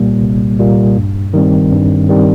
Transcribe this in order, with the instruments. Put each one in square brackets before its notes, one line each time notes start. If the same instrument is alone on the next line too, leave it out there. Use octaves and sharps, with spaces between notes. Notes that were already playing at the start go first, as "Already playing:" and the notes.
Already playing: [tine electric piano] C2 A#2 G3 A#3
C2
A#2 G3 A#3
G2
D#3 G3 C4
G2
D#3 G3 C4